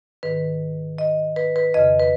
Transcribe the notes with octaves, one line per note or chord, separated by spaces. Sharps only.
G#2 D#3 B4
D#5
B4
B4
F2 C#3 D#5
B4